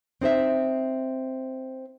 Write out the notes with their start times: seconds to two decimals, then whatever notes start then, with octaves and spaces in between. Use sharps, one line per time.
0.21 C4 D#4 C5 E5